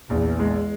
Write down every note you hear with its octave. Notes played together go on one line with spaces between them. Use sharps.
A#1 E2
G#3